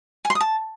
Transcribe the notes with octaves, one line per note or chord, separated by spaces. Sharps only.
G#5
C6
D#6
A5